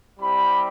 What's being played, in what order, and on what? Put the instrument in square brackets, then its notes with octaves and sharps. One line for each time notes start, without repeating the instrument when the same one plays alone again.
[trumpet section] G3 C4 E4 G4 B5